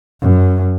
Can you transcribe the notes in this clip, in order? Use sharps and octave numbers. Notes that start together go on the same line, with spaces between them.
F#2